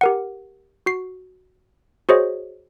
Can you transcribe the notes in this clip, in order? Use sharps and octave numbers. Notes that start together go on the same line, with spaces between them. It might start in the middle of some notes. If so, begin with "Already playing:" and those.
G4 A#4 F#5
F#4 C7
F#4 G#4 C5 C#5 D#5